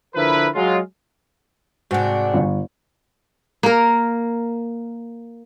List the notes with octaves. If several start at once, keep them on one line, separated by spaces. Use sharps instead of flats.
D3 F3 E4 A#4 B4
F#3 G#3 F4
G#2 C3 C4 D4 F#4 F#5
G1
A#3 A#4